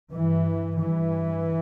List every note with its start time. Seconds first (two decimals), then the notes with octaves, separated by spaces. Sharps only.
0.13 G2 E3
0.79 G2 E3